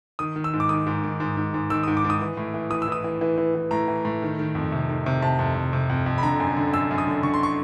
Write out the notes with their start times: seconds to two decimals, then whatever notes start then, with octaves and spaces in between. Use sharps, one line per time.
0.19 D#3 D#6
0.36 D#3
0.44 E6
0.53 G#2
0.60 D6
0.69 D#3 D#6
0.87 G#2
1.03 D#3
1.20 G#2
1.37 G#2
1.54 G#2
1.70 D#3 E6
1.83 G#2 D#6
1.97 D6
2.04 G#2
2.10 D#6
2.21 E3
2.37 A2
2.54 E3
2.70 E3 D#6
2.82 E6
2.88 E3 D#6
3.04 E3
3.21 E3
3.38 E3
3.55 E3
3.71 A2 A#5
3.88 E3
4.05 A2
4.22 D#3
4.39 D#3
4.55 F2
4.72 C3
4.89 D#3
5.06 C3
5.22 C3 A5
5.39 F2
5.55 C3
5.73 C3
5.89 F2
6.06 F2
6.18 B5
6.23 D3 A#5
6.40 F#2
6.57 D3
6.73 F#2 E6
6.91 F#2
6.98 D#6
7.07 D3
7.23 D3 C#6
7.34 C6
7.43 C#6